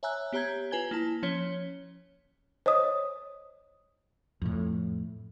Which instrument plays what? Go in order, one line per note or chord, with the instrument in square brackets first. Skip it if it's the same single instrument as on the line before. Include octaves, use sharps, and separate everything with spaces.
[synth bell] C#5 E5 G#5 A#5 E6 F#6
B3 G4 C#5 A#5 G6 G#6
F4 B4 G#5 G#6 G7
A#3 E4 A5
F3 C#4 C#5 B6 G7
[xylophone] C5 C#5 D#5 D#6
[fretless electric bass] F2 A2